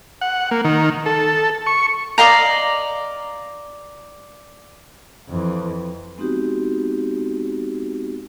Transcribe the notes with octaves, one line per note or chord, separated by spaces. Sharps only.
F#5
A#3
D#3
A4
C#6
D5 D#5 F5 A#5
F2 E3
G#3 B3 C4 D#4 F#4 G4